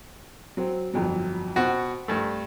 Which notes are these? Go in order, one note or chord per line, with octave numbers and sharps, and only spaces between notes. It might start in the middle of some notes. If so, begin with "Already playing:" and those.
F#3 C4
G1 F2 F#3
B2 C4 F#4
G2 A3